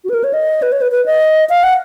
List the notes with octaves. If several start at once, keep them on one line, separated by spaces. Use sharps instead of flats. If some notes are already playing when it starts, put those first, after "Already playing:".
F#4
B4
A#4
C#5
D#5
B4
C#5
B4
B4
D#5
F5
F#5